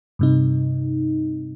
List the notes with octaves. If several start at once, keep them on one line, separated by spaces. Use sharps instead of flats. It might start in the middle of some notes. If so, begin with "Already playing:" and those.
G2 C3 D#4